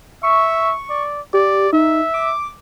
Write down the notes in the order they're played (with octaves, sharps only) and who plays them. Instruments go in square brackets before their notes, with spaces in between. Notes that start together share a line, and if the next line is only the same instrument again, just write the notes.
[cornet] E5 [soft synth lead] C#6
[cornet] D5
[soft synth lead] G4 [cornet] D5
[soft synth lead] D#4 [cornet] E5
[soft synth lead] D6